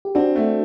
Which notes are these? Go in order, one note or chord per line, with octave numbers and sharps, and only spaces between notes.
G4
C4 D4 F#4
A3